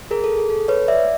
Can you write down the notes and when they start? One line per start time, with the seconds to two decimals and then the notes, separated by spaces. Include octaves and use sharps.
0.11 G#4 A#4
0.24 A4
0.37 G#4
0.50 A4
0.68 B4 C#5
0.88 D5 E5